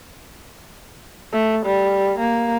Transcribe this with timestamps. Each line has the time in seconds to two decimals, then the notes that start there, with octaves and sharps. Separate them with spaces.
1.32 A3
1.66 G3
2.19 A#3